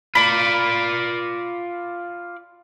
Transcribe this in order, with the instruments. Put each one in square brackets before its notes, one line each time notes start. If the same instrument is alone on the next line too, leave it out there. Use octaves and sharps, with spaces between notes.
[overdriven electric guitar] F4 D5 [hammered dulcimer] B5